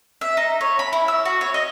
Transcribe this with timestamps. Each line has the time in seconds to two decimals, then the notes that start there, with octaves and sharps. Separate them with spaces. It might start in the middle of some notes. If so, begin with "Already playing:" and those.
0.21 E5
0.37 D#4
0.61 C#5
0.79 B5
0.93 E4
1.08 E6
1.25 F#4
1.41 C#5
1.54 D#5